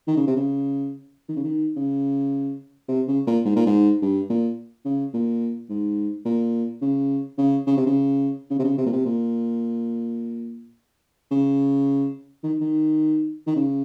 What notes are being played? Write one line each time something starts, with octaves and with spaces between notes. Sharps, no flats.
D#3
C#3
C3
C#3
D#3
C#3
D#3
C#3
C3
C#3
A#2
G#2
A#2
G#2
G2
A#2
C#3
A#2
G#2
A#2
C#3
C#3
C#3
C3
C#3
C#3
C3
C#3
C3
A#2
C3
A#2
C#3
D#3
D#3
D#3
C#3